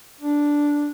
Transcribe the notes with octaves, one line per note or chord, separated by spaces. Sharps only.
D4